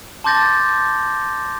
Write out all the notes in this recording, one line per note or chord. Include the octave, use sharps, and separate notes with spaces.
A5 C6 D6 G6 A6 A#6